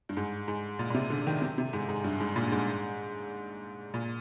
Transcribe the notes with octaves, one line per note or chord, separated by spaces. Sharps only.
G2
G#2
G#2
A#2
A#2
C3
D3
D#3
C3
C3
G#2
G#2
G2
G#2
A#2
G#2
A#2